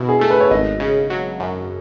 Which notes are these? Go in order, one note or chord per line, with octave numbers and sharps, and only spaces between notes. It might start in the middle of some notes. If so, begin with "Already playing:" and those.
Already playing: B2 E4
G#4
A3 A4
B4
C#5
G#1 D#5
C#3
F#3
F#2